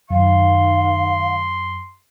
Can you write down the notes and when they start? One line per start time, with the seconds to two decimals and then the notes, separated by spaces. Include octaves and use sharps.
0.10 F#2 D#3 F5 C6